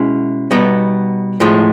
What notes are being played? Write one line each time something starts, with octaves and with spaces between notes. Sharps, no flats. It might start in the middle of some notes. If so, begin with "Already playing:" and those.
Already playing: B2 G#3 C#4 E4
B2 G3 B3 D#4
A2 F3 G#3